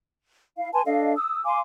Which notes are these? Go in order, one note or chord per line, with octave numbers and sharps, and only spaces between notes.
E4 F5
B4 G#5 A5 C6
D4 A4 D#5 F5
D#6 E6
F5 G#5 C6 D6